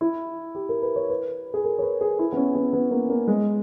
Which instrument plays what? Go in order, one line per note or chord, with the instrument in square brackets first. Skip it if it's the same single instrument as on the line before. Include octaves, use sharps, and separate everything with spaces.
[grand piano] E4
G4
A#4
B4
C#5
B4
G#4
A#4
C#5
B4
G#4
E4
B3
C#4
B3
B3
A#3
A#3
G#3